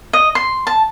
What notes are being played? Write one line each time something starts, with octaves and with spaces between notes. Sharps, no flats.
D#5
C6
A5